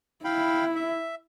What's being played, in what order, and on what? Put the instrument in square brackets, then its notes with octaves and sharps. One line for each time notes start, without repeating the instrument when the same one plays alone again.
[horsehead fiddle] E4 [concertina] F5 G5 B5
[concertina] E5